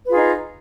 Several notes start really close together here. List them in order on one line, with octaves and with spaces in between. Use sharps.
B4 F4 G#4 D#4